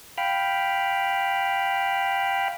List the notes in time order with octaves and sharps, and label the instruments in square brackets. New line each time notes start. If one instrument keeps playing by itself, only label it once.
[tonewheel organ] F5 G5 B5 F6